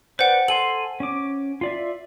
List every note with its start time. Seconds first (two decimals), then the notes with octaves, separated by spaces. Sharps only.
0.19 B4 C5 D5 F#5 G5
0.48 A4 G#5 C6 F#7
1.00 C#4 D6
1.61 F4 D5 E5